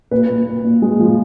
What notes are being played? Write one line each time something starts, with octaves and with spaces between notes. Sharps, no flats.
A#2 B4
A#2
A#2
A#2
G#3
F3